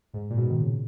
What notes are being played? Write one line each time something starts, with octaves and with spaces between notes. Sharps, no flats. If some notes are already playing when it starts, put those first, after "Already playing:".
G#2
A#2
G#2 B2
D#3
A#2 C#3